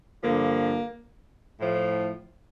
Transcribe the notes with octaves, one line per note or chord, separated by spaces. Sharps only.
G2 D3 F3 A#3
A2 F3